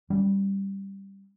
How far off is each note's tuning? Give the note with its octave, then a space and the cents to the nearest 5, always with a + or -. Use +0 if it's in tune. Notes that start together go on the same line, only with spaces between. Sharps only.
G3 +0 C#4 +0